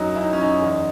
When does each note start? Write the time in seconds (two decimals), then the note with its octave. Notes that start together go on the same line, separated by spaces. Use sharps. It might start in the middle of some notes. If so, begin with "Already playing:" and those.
Already playing: F#2 F#3 D#4
0.15 F#2 E4
0.24 D#4
0.33 C#4
0.38 F#2 D#4
0.62 E2